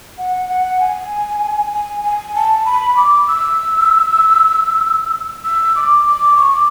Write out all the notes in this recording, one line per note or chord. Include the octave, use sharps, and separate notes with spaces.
F#5
F#5
G#5
G#5
G#5
A5
B5
D6
E6
E6
D6
D6
C#6
D6